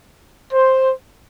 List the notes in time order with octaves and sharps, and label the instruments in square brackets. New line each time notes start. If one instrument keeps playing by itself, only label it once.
[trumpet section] C5